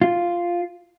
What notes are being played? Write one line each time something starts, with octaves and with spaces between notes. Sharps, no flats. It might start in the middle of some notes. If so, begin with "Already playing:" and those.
F4